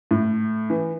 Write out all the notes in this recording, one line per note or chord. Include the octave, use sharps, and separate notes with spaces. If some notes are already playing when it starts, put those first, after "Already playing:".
A2
E3